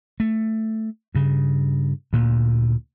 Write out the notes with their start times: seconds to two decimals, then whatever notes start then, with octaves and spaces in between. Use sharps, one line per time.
0.20 A3
1.15 G2 C#3
2.13 D2 A#2